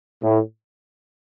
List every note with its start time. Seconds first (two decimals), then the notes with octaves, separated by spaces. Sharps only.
0.23 A2